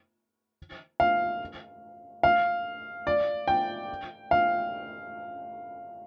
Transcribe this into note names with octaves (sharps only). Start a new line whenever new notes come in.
F5
F5
D5
G5
F5